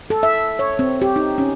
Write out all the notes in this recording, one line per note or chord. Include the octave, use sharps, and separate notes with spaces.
A4
E5
C#5
C4
G4
D#4
C#4